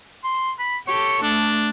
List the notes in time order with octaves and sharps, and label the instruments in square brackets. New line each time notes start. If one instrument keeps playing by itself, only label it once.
[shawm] C6
B5
[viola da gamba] G4 A4 [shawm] C#5
[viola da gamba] A3 [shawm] D4